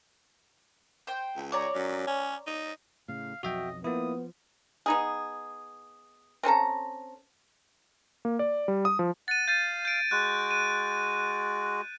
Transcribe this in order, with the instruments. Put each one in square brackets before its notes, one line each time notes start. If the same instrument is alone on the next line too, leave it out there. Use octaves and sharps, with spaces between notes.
[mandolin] C5 G5
[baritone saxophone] C#2
[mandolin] C#5 D5 A#5
[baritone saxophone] F#2
C#4
D#4
[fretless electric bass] A2 C#3 [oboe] F5
[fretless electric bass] B1 F2 F#3 [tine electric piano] F#4 E5 G5 [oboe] D#5
[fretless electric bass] F3 [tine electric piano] A#3 E4 [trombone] B3 [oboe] D#6
[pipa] B3 D#4 G#4
C4 C#4 A4 A#5
[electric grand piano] A#3
D5
G3
D#6
F3
[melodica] F#5 [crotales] A6 D#7
[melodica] F5 [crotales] G6 A6 D#7
[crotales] G6 D7
[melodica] G#3 F#4 [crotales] F#6
[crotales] D#7